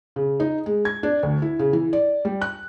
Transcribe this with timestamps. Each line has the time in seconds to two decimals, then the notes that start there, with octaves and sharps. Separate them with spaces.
0.16 C#3
0.40 D#4
0.66 G#3
0.85 G#6
1.03 D4
1.23 D2
1.42 E4
1.59 C#3
1.73 E3
1.93 D5
2.25 G3
2.42 F#6